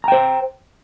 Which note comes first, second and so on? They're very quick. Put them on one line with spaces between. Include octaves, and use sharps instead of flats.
A#5 G5 C5